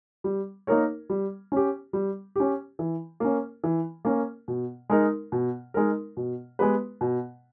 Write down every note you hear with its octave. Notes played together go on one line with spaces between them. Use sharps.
G3
A#3 D#4 A#4 C#5
G3
C#4 G4
G3
C#4 G4
E3
A#3 C#4
E3
A#3 C#4
B2
G#3 D#4 A#4
B2
G#3 D#4 A#4
B2
G#3 B3 G4 B4
B2